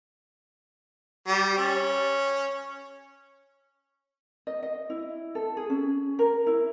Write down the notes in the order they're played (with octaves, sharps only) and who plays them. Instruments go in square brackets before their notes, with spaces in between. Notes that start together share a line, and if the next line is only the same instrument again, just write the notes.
[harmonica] G3
C#4
[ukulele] D#5
D#5
E4
A4
G#4
C#4
A#4
E4